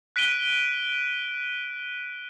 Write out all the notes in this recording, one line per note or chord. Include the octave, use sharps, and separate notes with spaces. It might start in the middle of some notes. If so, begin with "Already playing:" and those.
F#6 B6 D7 D#7 G7